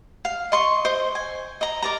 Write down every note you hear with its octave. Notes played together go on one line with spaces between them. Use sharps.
F5
D#5 C6 C#6
C5 D#5
G#5
D#5 A#5
A#4 D5 A#5